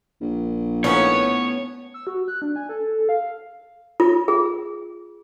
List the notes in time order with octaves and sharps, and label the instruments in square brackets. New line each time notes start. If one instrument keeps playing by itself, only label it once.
[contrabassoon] A#1
[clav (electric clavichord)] A2 C#4 [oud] B3 D#4 [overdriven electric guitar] C#5
[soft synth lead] E6
F#4
F#6
D4
G#5
A4
A4
F5
[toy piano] F4
G#4